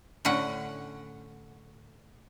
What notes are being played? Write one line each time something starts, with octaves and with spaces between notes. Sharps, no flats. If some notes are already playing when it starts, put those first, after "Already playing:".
A2 D3 C#4 F#5